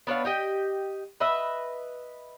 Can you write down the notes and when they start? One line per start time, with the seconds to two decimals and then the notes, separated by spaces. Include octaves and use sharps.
0.07 B3 D4 C#5 F5
0.25 G4 D#5 G5
1.20 B4 D#5 E5